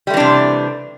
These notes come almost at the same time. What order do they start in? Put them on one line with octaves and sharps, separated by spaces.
G3 A3 E3 D4 C3